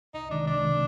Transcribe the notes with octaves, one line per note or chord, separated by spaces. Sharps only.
C2 D#4
C3 D#3 G#3 D4
C2 D4
C3 D#3 G#3